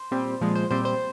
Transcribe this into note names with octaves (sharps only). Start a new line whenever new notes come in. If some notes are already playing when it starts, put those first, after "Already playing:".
Already playing: C5
A#2 G3 C4
A#2 F3 G#3
C5
A#2 G3 C4 C5
C5